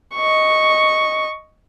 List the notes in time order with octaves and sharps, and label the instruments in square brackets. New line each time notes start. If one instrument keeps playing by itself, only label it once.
[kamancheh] D#5 C#6